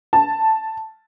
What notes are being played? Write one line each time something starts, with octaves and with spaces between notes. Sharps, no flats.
A5